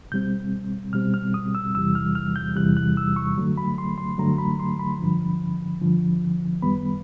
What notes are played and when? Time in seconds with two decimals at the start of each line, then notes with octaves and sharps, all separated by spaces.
0.12 B2 G3 C4 G6
0.93 B2 G3 C4 F6
1.14 F6
1.34 D#6
1.55 E6
1.75 E2 C3 E3 G3 E6
1.95 F6
2.15 F6
2.36 G6
2.56 E2 C3 E3 G3 F#6
2.77 F#6
2.97 E6
3.16 C#6
3.38 G2 D3 F#3 A3
3.58 B5
3.78 C6
3.98 C6
4.18 G2 D3 F#3 A3 A#5
4.38 B5
4.59 C6
4.79 B5
5.00 G2 D3 F3
5.81 G2 D3 F3
6.62 F#2 D#3 G3 B3 B5